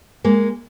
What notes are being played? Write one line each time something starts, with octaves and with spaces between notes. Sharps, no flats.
G#3 A#3